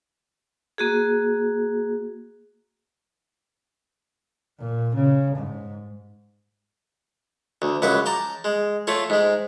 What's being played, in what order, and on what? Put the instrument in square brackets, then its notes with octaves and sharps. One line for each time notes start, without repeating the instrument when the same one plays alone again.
[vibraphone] A#3 F#4 G#4
[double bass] A#2
C#3
G#2
[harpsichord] D2
C#2 F#2 B4 F#5 D6
G5 A5 A#5 D6
G#3
A3 F4 C#5
G#2 G#3